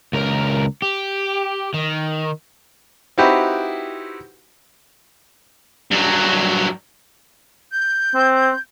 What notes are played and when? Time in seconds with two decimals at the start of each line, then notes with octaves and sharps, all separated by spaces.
0.13 C#2 A#4
0.82 G4
1.74 D#3
3.18 C4 D#4 E4 F#4 G4 B4
5.91 G2 F#3
7.72 G6
8.15 C4